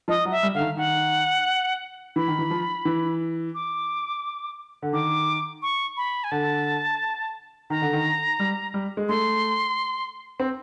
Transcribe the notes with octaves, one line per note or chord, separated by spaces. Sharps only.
F3 D#5
F#3
E5
G3
D3 F5
D#3
D#3 F#5
E3 B5
D#3
E3
F3
E3
D6
D3
D#3 D6
C#6
B5
G#5
D3 A5
D#3 A#5
D3
D#3
G3
G3
G#3
A3 C6
C4